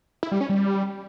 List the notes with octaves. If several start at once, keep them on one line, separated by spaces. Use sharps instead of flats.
E4
G3
C#4
G3